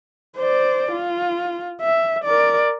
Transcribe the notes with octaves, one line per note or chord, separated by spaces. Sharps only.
C5 D5
F4
E5
A#4 D5